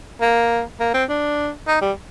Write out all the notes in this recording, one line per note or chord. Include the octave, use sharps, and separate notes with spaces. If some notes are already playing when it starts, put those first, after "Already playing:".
A#3
A#3
C4
D4
D#4
G3